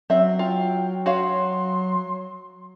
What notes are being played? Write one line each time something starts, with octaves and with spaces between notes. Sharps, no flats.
F#3 C4 E5
F4 G5
F#4 C#5 F5 C6